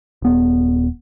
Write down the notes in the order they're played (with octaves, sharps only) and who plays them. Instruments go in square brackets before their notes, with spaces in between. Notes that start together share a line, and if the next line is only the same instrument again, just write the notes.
[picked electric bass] D#1 B3